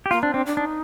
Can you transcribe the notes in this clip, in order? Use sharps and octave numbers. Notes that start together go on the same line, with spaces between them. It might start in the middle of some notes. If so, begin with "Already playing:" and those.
G4
A#3 F4
C4 D4
C4 D4
D4
D4 D#4